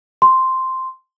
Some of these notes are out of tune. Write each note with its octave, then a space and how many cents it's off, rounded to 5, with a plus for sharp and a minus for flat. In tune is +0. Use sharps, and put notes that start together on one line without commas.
C6 -5